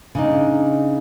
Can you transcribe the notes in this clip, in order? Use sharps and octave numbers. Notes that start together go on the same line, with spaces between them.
C#3 D4 D#4